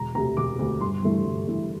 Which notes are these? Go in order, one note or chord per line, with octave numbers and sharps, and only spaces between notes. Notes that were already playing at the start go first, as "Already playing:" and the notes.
Already playing: E1 A#5
D2 C3 A#5
E1 D6
D2 C3
G1 C6
G2 E3 A3 E4
G1
G2 E3 A3 E4